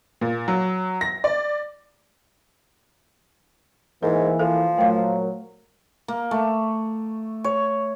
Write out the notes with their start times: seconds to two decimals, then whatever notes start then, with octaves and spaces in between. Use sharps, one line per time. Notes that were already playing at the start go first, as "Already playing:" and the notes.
0.21 A#2
0.48 F#3
1.01 A#6
1.24 D5
4.03 G#2 E3 A#3 A#4
4.39 F3 A4
4.78 A#2 F#3 A3 A#4 F5
6.08 A#3
6.31 A3
7.44 C#5